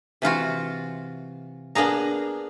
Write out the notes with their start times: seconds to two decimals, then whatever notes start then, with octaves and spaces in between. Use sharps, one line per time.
0.22 C3 E3 F4 F#4
1.75 A#3 B3 D4 G#4 A#5